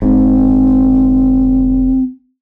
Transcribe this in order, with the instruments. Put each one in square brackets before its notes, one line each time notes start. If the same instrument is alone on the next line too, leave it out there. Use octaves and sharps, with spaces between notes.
[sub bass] F1 [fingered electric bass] G#2 [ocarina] C4